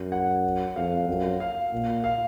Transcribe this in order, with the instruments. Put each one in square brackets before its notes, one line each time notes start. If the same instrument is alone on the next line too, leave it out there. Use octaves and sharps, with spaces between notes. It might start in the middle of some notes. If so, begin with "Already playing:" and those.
Already playing: [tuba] F#2
[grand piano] F#5
[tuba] F2 [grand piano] F5
[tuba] F#2
[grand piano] F5
[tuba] A#2
[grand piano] F5